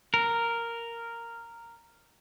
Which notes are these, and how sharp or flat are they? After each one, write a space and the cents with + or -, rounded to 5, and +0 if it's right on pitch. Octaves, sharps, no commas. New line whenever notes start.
A#4 -5